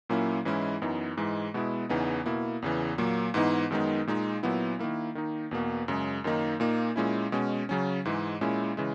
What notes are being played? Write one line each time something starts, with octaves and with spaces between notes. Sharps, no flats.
A#2 F#3 A#3 C#4 E4
G#2 E3 G#3 C#4 E4
F#2 E3 B3 D#4
G#2 E3 G#3
B2 G#3 B3 E4
E2 C#3 E3 B3 D#4
B2 A#3 E4
E2 C#3 E3
A#2 F#3 A#3
G#2 E3 B3 D#4
F#2 D#3 G#3 B3 D#4
A#2 G#3 D#4
A#2 F#3 B3 E4
D#3 A#3 E4
D#3 A#3 D#4
E2 B2 A#3
F#2 C#3 G#3
F#2 D#3 A#3 D#4
A#2 A#3 D#4
A#2 G#3 C#4 E4
B2 G#3 C#4
C#3 F#3 C#4
G#2 E3 G#3
A#2 G#3 C#4 E4
C#3 E3 G#3